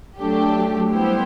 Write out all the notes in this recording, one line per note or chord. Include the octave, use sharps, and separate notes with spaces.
F#3 A3 D4 G4
G3 B3 E4 G4 C5